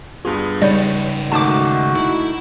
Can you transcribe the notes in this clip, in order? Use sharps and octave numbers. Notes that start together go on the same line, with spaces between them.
G2 B3 F4 G#4
C#3 G3 D#4 B4 C#5 B5
G#2 D#3 A3 F#4 A5 D6
A3 D#4 E4